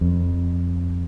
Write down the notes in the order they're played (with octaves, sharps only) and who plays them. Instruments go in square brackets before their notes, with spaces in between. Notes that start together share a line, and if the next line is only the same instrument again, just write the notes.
[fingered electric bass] F2